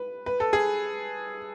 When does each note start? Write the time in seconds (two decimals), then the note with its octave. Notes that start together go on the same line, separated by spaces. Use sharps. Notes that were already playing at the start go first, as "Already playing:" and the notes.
Already playing: B4
0.26 B4
0.40 A4
0.53 G#4